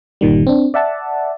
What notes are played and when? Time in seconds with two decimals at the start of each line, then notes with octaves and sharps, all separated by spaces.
0.21 G1 A#2 D#3 G3
0.47 C4 D4
0.74 D5 E5 F#5 A5